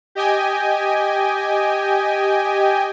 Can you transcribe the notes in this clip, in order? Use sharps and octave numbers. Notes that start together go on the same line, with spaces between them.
G4 D#5 G5 G#5